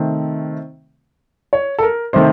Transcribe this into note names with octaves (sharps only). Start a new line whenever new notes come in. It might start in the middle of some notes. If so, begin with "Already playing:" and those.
Already playing: C3 D#3 A3 C4
C#5
A4
A#4
C3 D#3 A3 C5